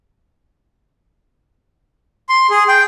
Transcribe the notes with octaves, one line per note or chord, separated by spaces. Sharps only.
C6
G#4
G5